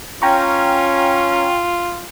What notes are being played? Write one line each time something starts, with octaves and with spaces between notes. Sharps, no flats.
C#4 F4 G5 A#5 C#6